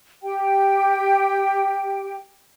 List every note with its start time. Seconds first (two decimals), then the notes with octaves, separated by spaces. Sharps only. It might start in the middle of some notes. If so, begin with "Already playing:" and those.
0.23 G4 G5